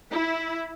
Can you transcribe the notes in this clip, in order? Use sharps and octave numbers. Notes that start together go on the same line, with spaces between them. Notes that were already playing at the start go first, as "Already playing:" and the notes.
E4